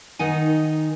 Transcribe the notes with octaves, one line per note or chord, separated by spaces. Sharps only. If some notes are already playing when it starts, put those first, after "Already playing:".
D#3 D#4 F#5 G#5